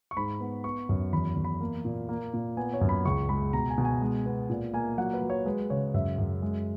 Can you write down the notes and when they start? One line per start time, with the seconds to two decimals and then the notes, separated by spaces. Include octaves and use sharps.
0.11 C#6
0.17 G#2 B5
0.41 B3
0.64 B3 C#6
0.89 F#2
1.13 E2 B5
1.36 E2
1.45 B5
1.61 A#3
1.85 A#2
2.09 A#3
2.34 A#2
2.57 B3 G#5
2.74 C#5
2.81 F#2
2.89 B5
3.05 C#2 C#6
3.29 G#3 B5
3.53 B2 A#5
3.70 G#5
3.78 B2
3.85 G#5
4.02 G#3
4.26 B3
4.50 A#2
4.74 A#3 G#5
4.98 F#3 F#5
5.14 B4
5.22 F#3
5.30 C#5
5.45 G#3 B4
5.70 C#3 C#5
5.94 F#2 E5
6.18 F#2
6.42 G#3